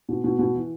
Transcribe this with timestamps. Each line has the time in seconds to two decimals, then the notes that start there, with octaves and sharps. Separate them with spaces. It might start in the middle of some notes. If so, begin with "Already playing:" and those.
0.09 B2
0.24 B2
0.39 B2
0.55 E3